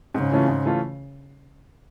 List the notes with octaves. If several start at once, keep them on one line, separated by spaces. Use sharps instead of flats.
G#2 C#3
E3 A3 C#4 F4
G#2
E3 A3 C#4 F4